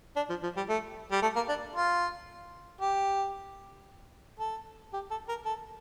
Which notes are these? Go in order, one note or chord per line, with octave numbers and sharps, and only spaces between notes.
D4
F3
F3
G3
A3
G3
A3
A#3
D4
F4
G4
A4
G4
A4
A#4
A4